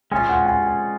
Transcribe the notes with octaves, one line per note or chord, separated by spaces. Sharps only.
G#3 C#4 F4 G#5
F#5
G#5
G#5